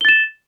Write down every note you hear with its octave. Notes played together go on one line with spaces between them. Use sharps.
A6 E7 G7